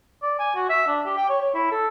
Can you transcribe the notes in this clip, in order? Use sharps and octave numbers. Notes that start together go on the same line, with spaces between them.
D5
G#5
F#4
E5
D4
G4
G5
C#5
C#5
E4
A4